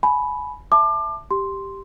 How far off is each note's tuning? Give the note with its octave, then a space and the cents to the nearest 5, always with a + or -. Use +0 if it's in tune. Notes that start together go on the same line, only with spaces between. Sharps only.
G#5 +30 B5 +0
E5 +0 A5 +0 D6 +30
G4 +0 C6 +0